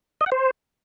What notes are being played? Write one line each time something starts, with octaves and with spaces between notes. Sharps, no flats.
D#5
F#5
C5